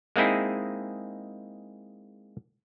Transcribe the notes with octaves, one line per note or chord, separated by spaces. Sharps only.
G#3 A#3 C4 D#4 E4 G#4